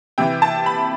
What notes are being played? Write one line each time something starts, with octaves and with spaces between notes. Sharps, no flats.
C3 E3 G5
A5
B5